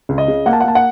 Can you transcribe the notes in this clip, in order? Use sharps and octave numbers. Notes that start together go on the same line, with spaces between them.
C#2
D#5
C#3
A#3 F#5
A5
F#5
A#3 A5
F#5